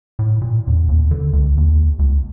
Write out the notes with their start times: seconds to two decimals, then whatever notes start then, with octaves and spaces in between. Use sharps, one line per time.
0.19 A2
0.42 A#2
0.67 E2
0.89 D#2
1.11 D3
1.33 C#2
1.57 D#2
1.99 C#2